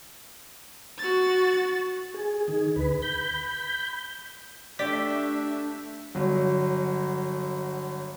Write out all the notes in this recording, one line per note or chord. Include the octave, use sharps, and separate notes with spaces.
F#4 A6
G#4
D#3 G#4
D2 B4
B5 G6
A3 D4 G4 D5 E5 B6
G1 F#3